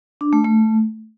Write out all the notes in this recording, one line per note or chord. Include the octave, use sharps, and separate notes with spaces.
D4
A3
A3